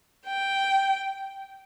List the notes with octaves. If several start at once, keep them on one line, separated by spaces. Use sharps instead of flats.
G5